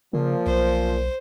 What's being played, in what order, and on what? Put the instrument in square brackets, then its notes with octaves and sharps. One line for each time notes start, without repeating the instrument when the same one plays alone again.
[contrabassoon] A#2 [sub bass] C#3 [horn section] F3
[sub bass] B1 [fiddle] C5